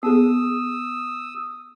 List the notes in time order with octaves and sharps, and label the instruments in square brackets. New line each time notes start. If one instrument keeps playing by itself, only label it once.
[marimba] B3 G#4 [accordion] D#6 E6